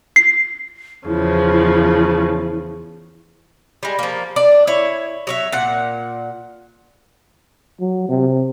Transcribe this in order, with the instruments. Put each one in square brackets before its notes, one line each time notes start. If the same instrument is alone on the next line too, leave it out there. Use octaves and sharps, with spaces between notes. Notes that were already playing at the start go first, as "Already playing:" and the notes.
[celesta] C7
[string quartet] E2 C#3 F3 [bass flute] E4
[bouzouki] G3 G#3
F3 A#3
D4 D5
E4 C#5
F#3 C#5 E5
A#2 F#5
[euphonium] F#3
C3